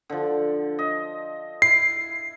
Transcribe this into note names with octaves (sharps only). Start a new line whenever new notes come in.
D3 F3
D#5
E4 C7